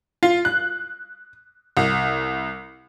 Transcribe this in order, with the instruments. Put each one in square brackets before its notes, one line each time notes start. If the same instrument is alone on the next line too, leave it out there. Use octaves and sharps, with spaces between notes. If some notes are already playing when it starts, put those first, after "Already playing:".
[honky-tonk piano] F4
F#6
C2